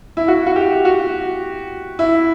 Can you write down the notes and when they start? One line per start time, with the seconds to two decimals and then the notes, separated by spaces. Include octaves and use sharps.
0.17 E4
0.28 F#4
0.46 F#4
0.56 G4
0.85 F#4
1.99 E4